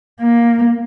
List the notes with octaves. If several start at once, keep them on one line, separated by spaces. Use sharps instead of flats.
A#3